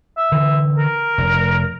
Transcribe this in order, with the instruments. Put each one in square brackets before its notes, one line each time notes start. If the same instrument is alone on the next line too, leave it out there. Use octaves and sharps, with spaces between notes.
[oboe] E5
[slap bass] D3 E3
[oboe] A#4
[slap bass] F1